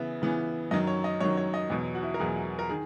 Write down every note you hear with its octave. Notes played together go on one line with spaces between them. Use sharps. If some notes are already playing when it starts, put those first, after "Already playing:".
Already playing: C#3 E3 B3 E5
C#3 E3 B3
F#2 D#3 F#3 D#5
C#5
D#5
F#2 D#3 F#3 C#5
C#5
D#5
E2 B2 F#3
F#4
E4
A#4
E2 B2 F#3 G#4
A#4
D#3 G#4